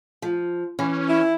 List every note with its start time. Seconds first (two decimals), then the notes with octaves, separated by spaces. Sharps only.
0.22 F3
0.79 E3 C#4
1.08 E4